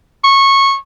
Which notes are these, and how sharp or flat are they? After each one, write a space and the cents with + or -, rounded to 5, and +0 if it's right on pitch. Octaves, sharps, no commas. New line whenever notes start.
C#6 -15